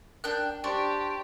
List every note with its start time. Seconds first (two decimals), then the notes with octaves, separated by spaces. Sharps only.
0.24 D4 A#4 G5 F#6
0.64 D4 G4 C5 C6 C#6